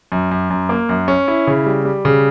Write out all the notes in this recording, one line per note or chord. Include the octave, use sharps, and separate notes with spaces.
F#2
F#2
F#2
A#3
F#2
C#4
E4
C#3
G3
G3
C#3